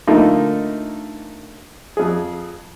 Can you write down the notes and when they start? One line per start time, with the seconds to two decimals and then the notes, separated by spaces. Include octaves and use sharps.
0.07 D3 A3 A#3 D#4 F4
1.97 F2 G#4